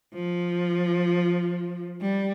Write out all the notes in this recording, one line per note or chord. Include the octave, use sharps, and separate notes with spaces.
F3
G3